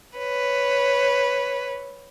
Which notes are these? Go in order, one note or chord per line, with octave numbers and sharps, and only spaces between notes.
B4 C#5